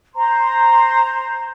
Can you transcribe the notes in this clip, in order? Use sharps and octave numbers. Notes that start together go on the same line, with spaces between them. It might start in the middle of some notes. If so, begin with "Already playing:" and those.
C5 A#5 C6